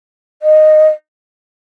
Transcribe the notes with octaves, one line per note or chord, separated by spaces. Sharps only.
D#5